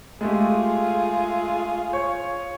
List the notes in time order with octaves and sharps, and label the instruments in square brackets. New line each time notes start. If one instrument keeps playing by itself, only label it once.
[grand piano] G#3 A3 G4 [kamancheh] F4 G#4
[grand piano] C#5